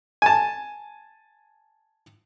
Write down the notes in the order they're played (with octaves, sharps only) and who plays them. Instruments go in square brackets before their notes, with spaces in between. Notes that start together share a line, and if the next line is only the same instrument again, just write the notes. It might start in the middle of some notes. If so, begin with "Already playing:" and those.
[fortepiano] G#5 A5